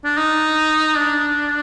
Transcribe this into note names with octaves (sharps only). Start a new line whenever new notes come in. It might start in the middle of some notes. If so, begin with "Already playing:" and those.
D4
D#4
D4